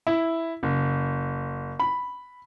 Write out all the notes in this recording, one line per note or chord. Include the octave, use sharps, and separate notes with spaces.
E4
F#1
B5